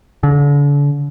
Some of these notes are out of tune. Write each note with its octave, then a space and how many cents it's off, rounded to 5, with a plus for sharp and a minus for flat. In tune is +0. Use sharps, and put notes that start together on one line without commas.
D3 -40